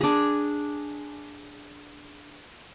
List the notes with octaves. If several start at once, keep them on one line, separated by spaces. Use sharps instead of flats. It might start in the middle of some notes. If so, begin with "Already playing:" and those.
D4 G#4